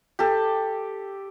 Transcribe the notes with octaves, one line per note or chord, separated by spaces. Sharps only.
G4 A4